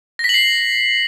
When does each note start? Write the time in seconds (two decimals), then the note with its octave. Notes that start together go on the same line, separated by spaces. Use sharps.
0.19 A#6
0.24 B6
0.29 F#7
0.34 C7